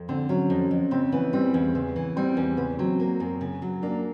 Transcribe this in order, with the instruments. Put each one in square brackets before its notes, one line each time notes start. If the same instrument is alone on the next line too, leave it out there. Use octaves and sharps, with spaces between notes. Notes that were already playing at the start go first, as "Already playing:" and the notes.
Already playing: [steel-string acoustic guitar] F2
[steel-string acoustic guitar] D3 [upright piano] C4
[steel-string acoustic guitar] F#3 [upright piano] C#4
[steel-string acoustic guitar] F2
F2
[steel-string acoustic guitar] C#3 [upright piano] C4
[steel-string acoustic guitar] E3 [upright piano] B3
[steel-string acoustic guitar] G3 [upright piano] C4
[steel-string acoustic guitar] E2
[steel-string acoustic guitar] C#3 [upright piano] B3
[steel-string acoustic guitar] E3
[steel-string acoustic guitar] G3 [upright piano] C4
[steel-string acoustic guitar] E2
[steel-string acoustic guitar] C#3 [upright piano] B3
[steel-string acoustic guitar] F#3 [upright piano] C4
[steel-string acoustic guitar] A#3
F#2
C#3
F#3
[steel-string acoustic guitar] A#3 [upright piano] D4